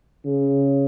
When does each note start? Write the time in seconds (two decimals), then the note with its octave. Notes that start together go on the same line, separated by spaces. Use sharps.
0.25 C#3